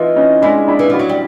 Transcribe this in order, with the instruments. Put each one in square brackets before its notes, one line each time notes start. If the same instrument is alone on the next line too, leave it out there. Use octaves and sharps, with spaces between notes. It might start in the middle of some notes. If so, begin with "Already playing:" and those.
Already playing: [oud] E3 [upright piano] D#4 F4
[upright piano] C#4 D#4
[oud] G#3 [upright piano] D4 E4
[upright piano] D4 E4
[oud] E3
[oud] F3 [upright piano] E4 F#4
[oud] F#3
G3